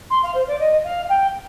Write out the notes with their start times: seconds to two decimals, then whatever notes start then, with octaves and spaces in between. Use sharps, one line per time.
0.10 C6
0.23 F5
0.34 C5
0.47 D5
0.60 D#5
0.84 F5
1.09 G5